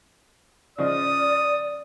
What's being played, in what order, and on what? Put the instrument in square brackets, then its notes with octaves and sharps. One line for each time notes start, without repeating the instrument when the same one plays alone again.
[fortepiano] C#3 F3 D#5 [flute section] D5 [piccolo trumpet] D#6